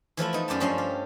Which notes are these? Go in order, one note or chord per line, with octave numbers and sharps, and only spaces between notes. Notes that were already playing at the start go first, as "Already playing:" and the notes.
E3 F3 A3 E4
B3 D#4
F#2 D5 G5 A5
G2 F3 C#4 D#5 A5 C6
G4